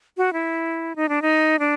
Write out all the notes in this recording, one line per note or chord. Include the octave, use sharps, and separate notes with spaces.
F#4
E4
D#4
D4
D#4
D4